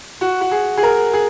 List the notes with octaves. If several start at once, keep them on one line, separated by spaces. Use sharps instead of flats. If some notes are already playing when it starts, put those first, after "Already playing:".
F#4
F#4
G#4
G#4
A#4
G#4